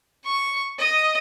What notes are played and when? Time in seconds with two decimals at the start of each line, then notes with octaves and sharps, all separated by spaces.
0.25 C#6
0.79 D#5